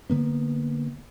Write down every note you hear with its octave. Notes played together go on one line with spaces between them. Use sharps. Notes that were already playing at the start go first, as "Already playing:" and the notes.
D3 A#3 B3